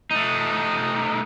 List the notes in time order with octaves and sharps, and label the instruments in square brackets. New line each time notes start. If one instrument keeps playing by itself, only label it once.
[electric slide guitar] A3 D#4